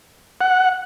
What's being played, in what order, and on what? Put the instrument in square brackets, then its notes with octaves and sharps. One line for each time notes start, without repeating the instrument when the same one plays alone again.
[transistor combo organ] F#5